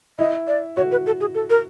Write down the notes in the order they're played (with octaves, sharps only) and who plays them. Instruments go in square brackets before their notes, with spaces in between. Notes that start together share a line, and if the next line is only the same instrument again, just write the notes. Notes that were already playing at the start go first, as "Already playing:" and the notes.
[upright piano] E4 [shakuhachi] D#5
[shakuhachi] D5
[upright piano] F#4 [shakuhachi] C#5
[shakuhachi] B4
A4
G#4
A4
A#4